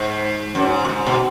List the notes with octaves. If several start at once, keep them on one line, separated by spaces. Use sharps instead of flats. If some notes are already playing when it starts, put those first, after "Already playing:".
Already playing: G#2
F#2
G#2
A#2
G#2
B2